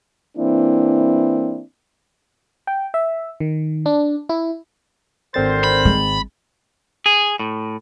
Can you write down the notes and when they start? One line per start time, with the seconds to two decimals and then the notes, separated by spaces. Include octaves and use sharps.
0.38 E3 A#3 C4 D4 E4
2.67 G5
2.94 E5
3.40 D#3
3.86 D4
4.29 E4
5.34 G#1 D3 C4 A#4 C5 A6
5.64 B5
5.85 G#3
7.06 G#4
7.40 A2